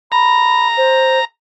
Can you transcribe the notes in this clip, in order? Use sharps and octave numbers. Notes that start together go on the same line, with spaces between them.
A#5 B5
C5